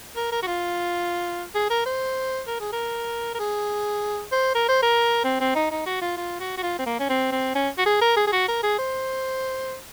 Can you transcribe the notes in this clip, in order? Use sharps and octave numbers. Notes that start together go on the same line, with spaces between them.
A#4
A#4
F#4
F4
G#4
A#4
C5
A#4
G#4
A#4
A#4
G#4
C5
A#4
C5
A#4
C4
C4
D#4
D#4
F#4
F4
F4
F#4
F#4
F4
C4
A#3
C#4
C4
C4
C#4
F#4
G#4
A#4
G#4
G#4
F#4
A#4
G#4
C5